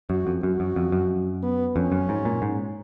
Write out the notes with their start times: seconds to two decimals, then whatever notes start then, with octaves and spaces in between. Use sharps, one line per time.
0.09 F#2 F#4
0.27 F2
0.43 F#2 F#4
0.60 F#2
0.76 F2
0.92 F#2
1.43 B3
1.76 F2 C#4
1.92 F#2
2.09 G#2
2.25 A#2
2.42 G#2